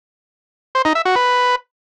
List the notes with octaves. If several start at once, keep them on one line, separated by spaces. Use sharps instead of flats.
C5
D#4
E5
F#4
B4